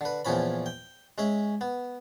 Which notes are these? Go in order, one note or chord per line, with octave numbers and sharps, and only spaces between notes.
D3 B4
E2 A#2 F3 C#4 B5
G5
G#3 C#4 E5
B3